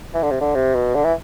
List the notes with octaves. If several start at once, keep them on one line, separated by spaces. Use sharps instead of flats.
E3
D3
C3
D3
C3
B2
D3
E3